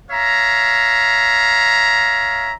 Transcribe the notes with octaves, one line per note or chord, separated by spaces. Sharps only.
C#5 E5 F5 A#5